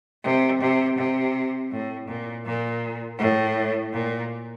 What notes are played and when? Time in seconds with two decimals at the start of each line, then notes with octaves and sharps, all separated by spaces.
0.24 C3
0.60 C3
0.98 C3
1.71 A2
2.08 A#2
2.46 A#2
3.19 A2
3.93 A#2